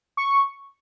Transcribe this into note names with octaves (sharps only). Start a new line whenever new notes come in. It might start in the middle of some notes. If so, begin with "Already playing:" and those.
C#6